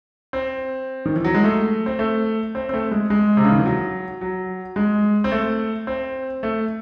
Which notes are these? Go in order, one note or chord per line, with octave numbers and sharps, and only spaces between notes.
C4
D#3
E3
F#3
G#3
A3
C4
A3
C4
C4
A3
G#3
G#3
C3
C#3
D#3
E3
F#3
F#3
G#3
C4
A3
C4
A3